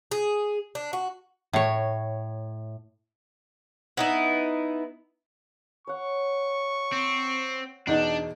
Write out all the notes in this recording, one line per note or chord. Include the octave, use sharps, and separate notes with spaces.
G#4
D4
F#4
A2 C#5
B3 D#4 E4
C#5 F#5 C#6
C4
E2 B2 D4 D#4